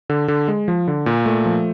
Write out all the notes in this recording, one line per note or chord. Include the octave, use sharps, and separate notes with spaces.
D3
D3
G#3
F3
D3
A#2
A3
F3